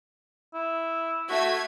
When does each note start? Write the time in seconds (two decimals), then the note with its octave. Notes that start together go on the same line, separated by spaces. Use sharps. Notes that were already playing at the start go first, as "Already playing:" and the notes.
0.54 E4
1.29 A3 F#4 G#6 B6